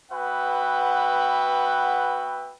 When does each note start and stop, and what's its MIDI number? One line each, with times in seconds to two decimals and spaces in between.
0.12 2.54 59
0.12 2.54 66
0.12 2.54 71
0.12 2.54 76
0.12 2.54 78
0.12 2.54 79